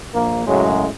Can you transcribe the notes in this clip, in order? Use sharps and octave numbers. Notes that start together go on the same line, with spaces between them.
A#1 A#3
F#2 A2 C#3 F#3 G#3